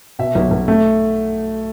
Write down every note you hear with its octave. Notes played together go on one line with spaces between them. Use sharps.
B2 E5
B1
B1
A3